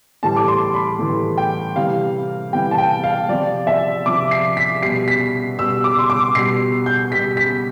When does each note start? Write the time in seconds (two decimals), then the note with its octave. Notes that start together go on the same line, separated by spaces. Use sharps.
0.23 A2 E3 G3 A5
0.36 D6
0.48 C6
0.74 B5
0.99 A2 E3 G3
1.37 G5
1.76 C3 E3 G3 F5
2.52 C3 E3 G3 G5
2.71 A5
2.78 G5
3.04 F5
3.29 C3 F3 D5
3.67 E5
4.06 C3 D6
4.09 F3
4.31 C7
4.57 B6
4.82 B2 G3 C7
5.08 B6
5.58 B2 G3 E6
5.84 D6
5.99 C6
6.10 D6
6.35 B2 G3 C7
6.86 G6
7.12 G3 B6
7.15 B2
7.37 B6